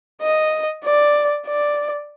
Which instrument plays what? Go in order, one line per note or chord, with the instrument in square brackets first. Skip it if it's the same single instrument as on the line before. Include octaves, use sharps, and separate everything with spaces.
[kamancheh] D#5
D5
D5